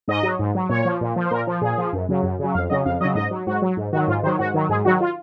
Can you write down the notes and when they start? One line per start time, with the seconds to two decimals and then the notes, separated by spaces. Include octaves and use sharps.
0.08 G#2 D#5
0.23 F#3
0.39 G#2
0.55 F#3
0.69 A#2 C#5
0.85 F3
1.01 A#2
1.16 F3
1.26 C5
1.31 A#2 A#4
1.47 F3
1.61 A#2 G#4
1.78 F3
1.93 F#2
2.09 C#3 F#3
2.23 F#2
2.39 C#3 F#3
2.54 F2 F5
2.70 C#3 F#3 D#5
2.86 F2 F5
3.01 C#3 F#3 D#5
3.15 G#2 D#5
3.31 F#3
3.47 G#2 F#4
3.62 F#3
3.77 G#2
3.92 D#3 F#4
3.96 F#3
4.08 G#2 F4
4.23 D#3 C5
4.27 F#3
4.39 G#2 F#4
4.54 D#3 F#3
4.69 G#2 G#4
4.85 D#3 F#3 F#4
5.01 F4